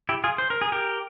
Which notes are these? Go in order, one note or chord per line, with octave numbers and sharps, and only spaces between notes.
E4 G4
F4 G#4
C5
A#4
G#4
G4 A#4